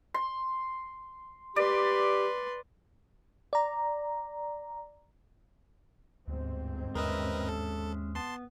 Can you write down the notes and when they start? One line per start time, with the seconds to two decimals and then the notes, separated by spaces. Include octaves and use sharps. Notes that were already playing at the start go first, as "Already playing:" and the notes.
0.14 C6
1.56 G4 B4 D5 C6
3.53 D5 A#5
6.28 G1 D2 G#2 C4
6.95 D#2 G#3 C#4 A#4 B4 D#5 E5
7.49 A4
8.15 B3 A5 C6